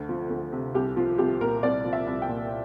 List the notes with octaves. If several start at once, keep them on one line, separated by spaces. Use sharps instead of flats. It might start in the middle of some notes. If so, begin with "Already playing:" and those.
Already playing: D2 D3
F3
D2
C3
C2 G4
F3 F4
C2 G4
A#2 A#4
C2 D5
F3
E5
C2
G5
A#2